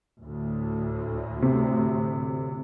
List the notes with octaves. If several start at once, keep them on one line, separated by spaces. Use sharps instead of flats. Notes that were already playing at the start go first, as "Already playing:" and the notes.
D2 A2
C3